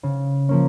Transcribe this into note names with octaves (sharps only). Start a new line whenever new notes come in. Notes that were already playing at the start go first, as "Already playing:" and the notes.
C#3
F3 A#3 C#4